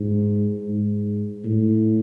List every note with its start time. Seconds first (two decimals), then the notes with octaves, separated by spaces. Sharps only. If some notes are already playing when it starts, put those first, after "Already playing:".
Already playing: G#2
0.69 G#2
1.45 A2